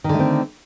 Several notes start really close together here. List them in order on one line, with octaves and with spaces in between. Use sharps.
D#3 D3 A3 C4